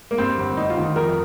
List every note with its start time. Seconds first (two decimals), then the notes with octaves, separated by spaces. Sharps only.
0.11 A#3
0.18 G2 C4
0.38 G1
0.57 G2 D#4
0.70 F4
0.77 D#3
0.96 F2 A#4